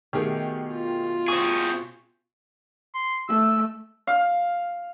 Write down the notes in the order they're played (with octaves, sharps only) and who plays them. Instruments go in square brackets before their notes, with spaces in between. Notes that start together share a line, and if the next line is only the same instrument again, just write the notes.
[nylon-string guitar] B2 A3 [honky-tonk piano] D#3 G4 G#4
[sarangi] F4
[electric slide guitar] C4 G#4 [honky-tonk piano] C#6
[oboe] C6
[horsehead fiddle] A3 [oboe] E6
[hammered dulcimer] F5